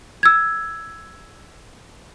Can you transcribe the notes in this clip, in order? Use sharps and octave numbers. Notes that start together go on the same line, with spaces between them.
E6 G#6